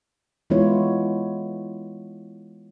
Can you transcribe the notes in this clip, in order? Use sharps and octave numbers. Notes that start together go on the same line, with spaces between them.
E3 G#3 B3 E4 F4 C#5